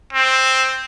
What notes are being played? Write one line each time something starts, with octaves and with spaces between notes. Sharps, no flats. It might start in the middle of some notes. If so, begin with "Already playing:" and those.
C4